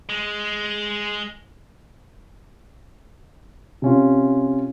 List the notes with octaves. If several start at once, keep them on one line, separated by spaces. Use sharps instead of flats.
G#3
C3 C#4 F4